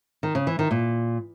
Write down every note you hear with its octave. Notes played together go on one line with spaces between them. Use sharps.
D#3
C#3
E3
D#3
A#2